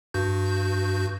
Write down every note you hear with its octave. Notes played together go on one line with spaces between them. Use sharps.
G2 F#4 G6